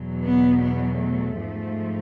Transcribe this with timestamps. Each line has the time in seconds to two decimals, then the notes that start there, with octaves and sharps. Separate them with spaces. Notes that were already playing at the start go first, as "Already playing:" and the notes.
Already playing: E2 B2 F#3
0.22 B3
0.61 B3
1.00 A3
1.40 G#2 F3